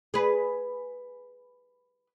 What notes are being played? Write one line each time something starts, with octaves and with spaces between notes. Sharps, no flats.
G#4 B4